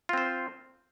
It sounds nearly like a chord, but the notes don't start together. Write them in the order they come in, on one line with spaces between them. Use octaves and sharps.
F4 C4 C5